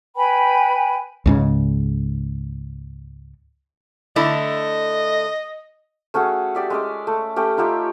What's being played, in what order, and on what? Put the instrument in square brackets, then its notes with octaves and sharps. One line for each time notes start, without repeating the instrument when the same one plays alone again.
[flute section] B4 G5 G#5 B5
[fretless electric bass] C#2 G#2 C#3
[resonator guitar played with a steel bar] D3 A3 E4 [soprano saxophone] D#5
[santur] A3 C#4 F#4 G#4
G4 D5 E5
G#3 C#4 D5
A3
A3 C#4 G4
D#4 F4 G4 E5